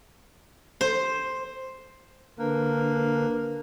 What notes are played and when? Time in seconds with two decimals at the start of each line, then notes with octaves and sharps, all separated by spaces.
0.81 C5
2.39 D3 A#3 D4 B4